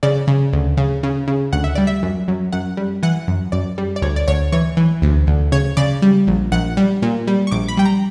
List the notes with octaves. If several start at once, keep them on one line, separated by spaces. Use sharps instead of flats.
C#3 D5
C#3
D2
C#3
C#3
C#3
D2 F#5
E5
G3 D5
E5
F#2
F#2
F#2 F#5
G3
E3 F#5
F#2
F#2 D5
G3
D5
D2 C#5
D5
D2 C#5
E3 C#5
E3
D2
D2
C#3 C#5
C#3 D5
G3
A#1
A#1 F#5
G3
A#2
G3
C#6
A#1 D6
B5
G3 G5
A#5